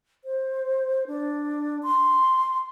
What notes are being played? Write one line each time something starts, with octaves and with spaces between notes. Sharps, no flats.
C5
D4
C6